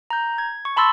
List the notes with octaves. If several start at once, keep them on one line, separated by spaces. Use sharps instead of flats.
A#5 G6
G#6
C#6
A5 B5 C6 E6 A6